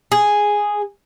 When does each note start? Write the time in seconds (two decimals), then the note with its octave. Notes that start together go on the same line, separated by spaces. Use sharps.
0.12 G#4